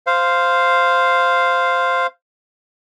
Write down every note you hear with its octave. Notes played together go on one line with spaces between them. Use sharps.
C5 F5